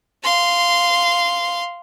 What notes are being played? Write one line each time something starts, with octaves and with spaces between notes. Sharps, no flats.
F5 C6